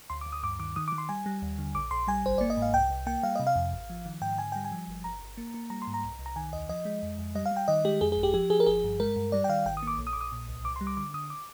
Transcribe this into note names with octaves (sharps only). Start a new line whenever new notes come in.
D2 C6
D6
D2
D#6
G2 D6
D#3 D6
D#3 D#6
D6
D#3
C6
G3 G#5
G3
D#2
D3
A#1 D6
A#1 C6
G3 G#5
G1 C5
A#3 D5
D#5
G#2
F5
C2 G5
C2
A#3 G5
G3 F5
C3 D#5
F5
F2
G#1
F3
D#3
G#2 G5
D3 G#5
G3 G5
G#5
F3
G1
G1 A#5
G1
A#3
A#3
G3 A#5
C6
G#2
A#5
C2
C2
A#5
D#3 G#5
D#2 D#5
F3 D#5
G#3
F2
F2
G3 D#5
F5
G3
G5
D#3 D#5
G#3 G4
F2 G#4
G#4
G1
G4
F3 G4
F3 G#4
A#4
G1 G#4
G2
G#3 A#4
G2
G3 D5
G5
D#3 F5
G#1 G5
D#6
A#3 D6
A#1
D#6
D6
A#1
D#6
A#2
C2
C2 D6
C6
G3
D6
D3 D6
D3 D#6
D6